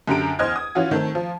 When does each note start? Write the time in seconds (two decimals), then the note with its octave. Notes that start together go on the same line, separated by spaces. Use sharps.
0.08 F#2 D3 G4 A#5 D7
0.39 E2 C5 D#5 F6 G#6
0.56 D#6
0.75 E3 C#4 F4 F#4
0.91 D#3 A3 C4
1.15 F3